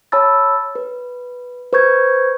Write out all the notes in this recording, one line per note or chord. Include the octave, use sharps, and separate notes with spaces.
C#5 A5 B5 E6 A6
B4
B4 C5 C#6 G6 G#6